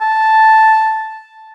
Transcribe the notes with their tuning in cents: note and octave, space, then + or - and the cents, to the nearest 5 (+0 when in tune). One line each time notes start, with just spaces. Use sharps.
A5 +0